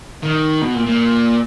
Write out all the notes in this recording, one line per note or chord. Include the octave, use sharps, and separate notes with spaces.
D#3
B2
A#2
A#2